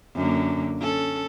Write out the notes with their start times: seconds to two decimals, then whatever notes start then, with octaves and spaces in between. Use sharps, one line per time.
0.15 F#2 D3 A#3
0.79 C#4 A4